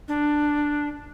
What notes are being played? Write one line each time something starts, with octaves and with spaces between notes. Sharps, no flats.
D4